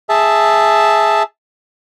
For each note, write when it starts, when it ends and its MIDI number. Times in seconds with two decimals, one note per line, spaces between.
0.09 1.23 68
0.09 1.23 76
0.09 1.23 81